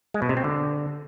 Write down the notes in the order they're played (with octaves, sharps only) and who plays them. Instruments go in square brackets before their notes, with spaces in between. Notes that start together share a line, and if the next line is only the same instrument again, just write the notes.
[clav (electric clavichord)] G#3
B2
C3
C4
D3